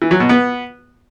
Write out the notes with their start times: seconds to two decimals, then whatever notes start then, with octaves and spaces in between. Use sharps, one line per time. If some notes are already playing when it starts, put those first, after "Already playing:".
0.02 E3
0.11 F#3
0.20 B2
0.29 B3